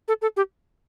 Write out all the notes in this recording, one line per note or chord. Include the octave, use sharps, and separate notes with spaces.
A4
A4
G4